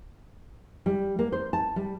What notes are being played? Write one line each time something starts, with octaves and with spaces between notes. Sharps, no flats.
G3
A#3
C5
A5
G3